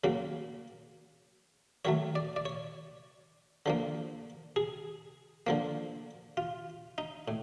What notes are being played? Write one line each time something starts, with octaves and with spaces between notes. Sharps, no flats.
C#3 F#3 A#3
D#3 F#3 A3 C#5
D5
D5
C#5
D3 F3 A#3
G#4
D3 F3 A#3
F4
D#4
A2